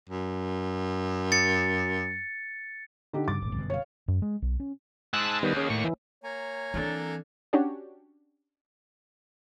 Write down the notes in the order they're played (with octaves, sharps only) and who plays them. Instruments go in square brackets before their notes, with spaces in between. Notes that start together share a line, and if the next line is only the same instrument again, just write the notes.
[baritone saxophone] F#2
[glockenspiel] A6 C#7
[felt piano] D3 D#4 G4
[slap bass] G2 C#3 G3 [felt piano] D6 A6
[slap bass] D#1 G#1
G1 F#2 B2
[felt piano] C#5 F5
[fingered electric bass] F#2
G#3
B1
C#4
[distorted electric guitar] G#2 G#3 [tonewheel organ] A5 E6 F#6
[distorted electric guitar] D#2 [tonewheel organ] D#3 G3 B3
[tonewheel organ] C#4 G#4
A2 C#6
E3
[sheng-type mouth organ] A#3 G#5 A#5 [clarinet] C#5
[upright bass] E3 C4 [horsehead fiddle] D4 A4
[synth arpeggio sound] C#4 D4 F#4 G4 C#5